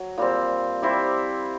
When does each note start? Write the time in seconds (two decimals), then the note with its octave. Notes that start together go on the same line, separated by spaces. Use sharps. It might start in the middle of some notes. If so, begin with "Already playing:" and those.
Already playing: F#3
0.18 A#2 G3 C4
0.82 G3 C4 E4 G4